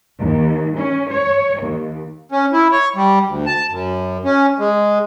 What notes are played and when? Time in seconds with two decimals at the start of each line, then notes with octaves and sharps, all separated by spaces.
0.19 D#2
0.76 C#4
1.10 C#5
1.62 D#2
2.32 C#4
2.53 E4
2.72 C#5
2.96 G3
3.27 D2
3.46 A5
3.70 F#2
4.25 C#4
4.59 G#3